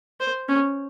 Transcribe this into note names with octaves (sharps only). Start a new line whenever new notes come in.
C5
C#4